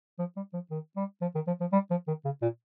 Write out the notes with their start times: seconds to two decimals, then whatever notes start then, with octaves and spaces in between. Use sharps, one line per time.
0.19 F3
0.36 G3
0.54 F3
0.70 D#3
0.96 G3
1.22 F3
1.35 D#3
1.47 F3
1.61 F3
1.73 G3
1.91 F3
2.07 D#3
2.25 C#3
2.42 A#2